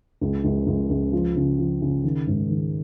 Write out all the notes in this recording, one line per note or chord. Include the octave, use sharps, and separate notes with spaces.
C#2
C#2
C#2
C#2
F3
C#3
F3
C#3
D#3
G#2
D#3